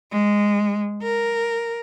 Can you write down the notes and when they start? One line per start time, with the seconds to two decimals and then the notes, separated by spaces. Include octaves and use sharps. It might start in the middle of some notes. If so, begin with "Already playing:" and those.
0.11 G#3
1.03 A#4